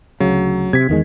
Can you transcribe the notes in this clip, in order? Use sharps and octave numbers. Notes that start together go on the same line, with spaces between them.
D2 C#3 F#3
C3 G#6 B6
E2 D#3 G#3